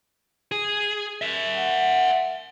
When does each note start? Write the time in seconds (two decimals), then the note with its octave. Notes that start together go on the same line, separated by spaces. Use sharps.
0.52 G#4
1.21 A#4 E5
1.55 F#5